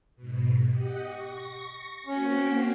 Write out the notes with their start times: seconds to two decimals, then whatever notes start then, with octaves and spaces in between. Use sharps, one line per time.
0.16 G#2 B2
0.71 G4 D#5 F#5
1.05 C#6 A#6
2.07 A#3 C4 C#4 F#4